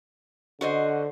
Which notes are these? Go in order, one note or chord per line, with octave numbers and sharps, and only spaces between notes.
D3 F#4 C5 D#5